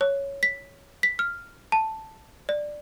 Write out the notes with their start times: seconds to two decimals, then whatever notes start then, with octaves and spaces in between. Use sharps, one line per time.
0.01 C#5
0.43 B6
1.03 B6
1.19 F6
1.72 A5
2.49 D5